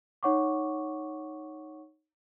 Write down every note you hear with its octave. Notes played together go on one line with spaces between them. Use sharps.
D#4 C#5 F#5 C#6 D6